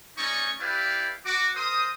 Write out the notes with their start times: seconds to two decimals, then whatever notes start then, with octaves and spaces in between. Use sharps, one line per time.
0.17 A3 C#4 D#4 D5 D#5 C#6
0.60 E4 G4 B4 D5 F5
1.25 F#4 D6
1.56 A#4 C5 C6 D#6